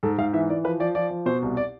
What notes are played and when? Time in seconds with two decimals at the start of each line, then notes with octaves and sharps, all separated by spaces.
0.03 G#2 A4
0.18 G#2 F5
0.33 E3 E5
0.50 E3 D5
0.64 F3 B4
0.80 F3 D5
0.95 F3 D5
1.11 F3
1.26 B2 C5
1.42 C2
1.57 D5